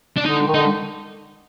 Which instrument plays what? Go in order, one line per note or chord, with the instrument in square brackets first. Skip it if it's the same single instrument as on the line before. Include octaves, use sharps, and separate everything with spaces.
[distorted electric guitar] D4
[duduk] D3 [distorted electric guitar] D#4
[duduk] D#3
[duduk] D3 [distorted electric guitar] D#4